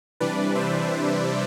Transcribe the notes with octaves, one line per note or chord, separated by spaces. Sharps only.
C3 E3 G3 D4 B4 D5
C5 E5